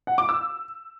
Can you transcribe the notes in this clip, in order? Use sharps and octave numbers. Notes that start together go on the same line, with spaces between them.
F#5
D6
E6